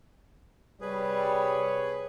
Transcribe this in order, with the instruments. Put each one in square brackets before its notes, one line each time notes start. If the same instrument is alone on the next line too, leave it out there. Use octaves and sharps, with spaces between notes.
[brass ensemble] C3 C#5 [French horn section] G3 [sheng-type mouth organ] G#4 B4